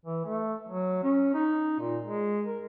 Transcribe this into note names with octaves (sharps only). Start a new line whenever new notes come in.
E3
A3
F#3
C#4
D#4
A#2
G#3
A#4